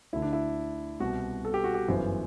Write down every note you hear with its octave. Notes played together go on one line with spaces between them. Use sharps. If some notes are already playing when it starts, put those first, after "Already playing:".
D2 D3 E4
D4
E4
C2 B2 F#4
A4
G4
F#4
G4
G1 F#2 E3 C5